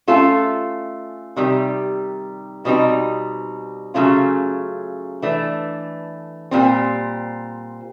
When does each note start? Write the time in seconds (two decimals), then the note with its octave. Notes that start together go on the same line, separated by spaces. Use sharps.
0.08 A3 C#4 F4 A4
1.36 C3 D#3 G3
2.65 B2 G3 C4 D#4
3.94 C#3 F#3 A3 C#4 F4
5.22 E3 A3 D4
6.51 A#2 G3 C4